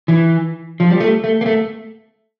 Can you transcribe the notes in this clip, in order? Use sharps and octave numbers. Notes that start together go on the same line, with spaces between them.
E3
F3
G3
A3
A3
A#3
A3